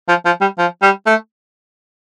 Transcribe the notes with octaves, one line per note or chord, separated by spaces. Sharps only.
F3
F3
G3
F3
G3
A3